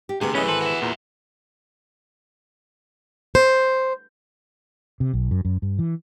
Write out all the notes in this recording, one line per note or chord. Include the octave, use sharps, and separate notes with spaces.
G4
D2 C3 B3 G#4
F#2 E3 A3 C#4 D#5
G#1 A4 B4 C5
F#4 E5
E2 A#2
C5
C3
B1
F#2
F#2
G2
E3